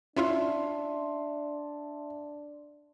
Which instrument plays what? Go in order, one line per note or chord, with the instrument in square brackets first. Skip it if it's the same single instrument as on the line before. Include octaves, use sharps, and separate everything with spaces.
[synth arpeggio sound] C#4 E4 F4 [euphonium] D4 [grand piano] E5 C6